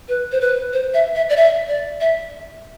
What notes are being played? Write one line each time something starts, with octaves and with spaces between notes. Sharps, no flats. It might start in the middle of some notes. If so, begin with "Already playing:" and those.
B4
C5
B4
C5
E5
E5
D5
E5
D5
E5